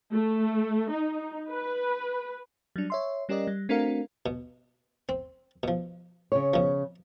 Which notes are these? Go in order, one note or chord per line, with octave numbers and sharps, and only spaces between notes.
A3
D#4
B4
F#3 G3 D4
C#5 E5 C6
G3 C#4 G4 A#4 D5 D#5
G3
A3 C4 D4 F#4 A#4 F5
B2
C4
B2 F3
C#3 C#5
B2 F3